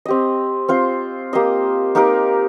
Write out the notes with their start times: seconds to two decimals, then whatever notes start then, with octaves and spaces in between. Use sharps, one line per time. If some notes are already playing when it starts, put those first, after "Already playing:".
0.05 C4 G4 D#5
0.68 C4 F4 C5
1.33 A#3 G4 C5 D#5
1.95 A#3 D#4 G4 A#4